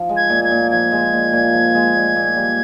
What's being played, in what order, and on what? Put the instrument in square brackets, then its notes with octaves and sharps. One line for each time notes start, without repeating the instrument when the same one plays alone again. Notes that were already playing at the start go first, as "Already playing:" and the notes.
Already playing: [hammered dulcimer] F3
G#3
[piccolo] G#6
[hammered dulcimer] A#2
[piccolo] G#6
[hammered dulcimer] A#2
[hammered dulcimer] F3 [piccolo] G#6
[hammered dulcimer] G#3
A#2
A#2
F3
G#3
A#2
A#2
G3